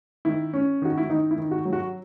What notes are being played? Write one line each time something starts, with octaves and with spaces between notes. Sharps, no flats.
D#3 E4
C#4
D#3 F#4
E4
D#3 D#4
E4
D#3
F#4
F#3
F#4